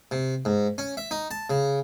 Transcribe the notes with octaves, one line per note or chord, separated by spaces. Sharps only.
C3
G#2
C#4
E5
D#4
A5
C#3